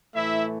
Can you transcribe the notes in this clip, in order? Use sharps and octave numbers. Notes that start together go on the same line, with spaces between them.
A2 E3 A3 E4 E5